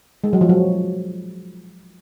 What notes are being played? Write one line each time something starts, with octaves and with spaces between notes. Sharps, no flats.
G#3
F#3
F3
F#3